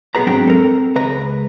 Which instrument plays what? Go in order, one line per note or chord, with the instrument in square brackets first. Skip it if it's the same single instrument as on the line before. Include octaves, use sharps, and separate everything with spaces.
[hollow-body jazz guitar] B1 B3 G#4 B4 A#5
G#2 F#3 C4 D4 G5 A#5
C4 A4 A#4
C#2 B4 A#5